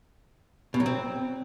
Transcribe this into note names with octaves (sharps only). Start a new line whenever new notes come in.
B2
F#3
C4